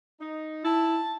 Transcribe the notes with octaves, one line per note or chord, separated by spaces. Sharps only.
D#4
E4 A5